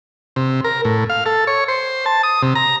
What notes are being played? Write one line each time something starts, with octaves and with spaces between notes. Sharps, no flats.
C3
A#4
A2
F5
A4
C#5
C5
A5
D#6
C3
A#5